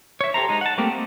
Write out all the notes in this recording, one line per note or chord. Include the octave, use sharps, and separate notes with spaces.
C#5 E5
G4 A4 C5 A#5
G#3 D#4
F#5 A5
G3 A3 A#3 C4 G4
C4 D#5